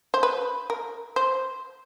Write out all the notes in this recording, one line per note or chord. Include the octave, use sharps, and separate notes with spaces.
C5
B4
A#4
C5